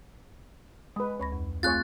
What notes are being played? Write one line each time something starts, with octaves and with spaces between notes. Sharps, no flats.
G#3 B4 D#6
D2 C#5 B5 A#6
F2
A3 C4 F4 G#4 C#5 F#6 A6